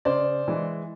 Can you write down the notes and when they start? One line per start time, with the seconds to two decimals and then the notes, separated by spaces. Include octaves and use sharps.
0.05 C#3 C5 D5
0.48 E3 G#3